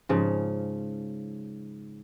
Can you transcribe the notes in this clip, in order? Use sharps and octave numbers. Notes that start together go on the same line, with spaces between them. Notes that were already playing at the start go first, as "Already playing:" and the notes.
G#2 C#3 F3